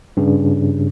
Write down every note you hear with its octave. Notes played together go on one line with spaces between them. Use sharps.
G2 C#3